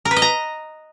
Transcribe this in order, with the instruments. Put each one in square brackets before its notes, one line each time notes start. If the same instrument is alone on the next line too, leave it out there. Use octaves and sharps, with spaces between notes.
[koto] A#4
B4
D#5
A#5